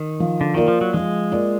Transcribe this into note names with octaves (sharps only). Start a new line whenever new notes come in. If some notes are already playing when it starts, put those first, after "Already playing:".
Already playing: D#3
F3
D3
D#3 A#3 F4 A#4 D5
F3
F#3
F3 G#3
A#3 F4 A#4 D5